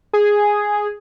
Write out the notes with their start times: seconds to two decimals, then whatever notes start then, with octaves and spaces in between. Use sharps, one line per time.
0.13 G#4